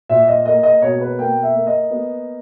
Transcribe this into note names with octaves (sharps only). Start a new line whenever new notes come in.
A#2 E5
D#5
A#3 D#5
D#5
B2 C#5
B4
A#3 G5
E5
A#3
D#5
B3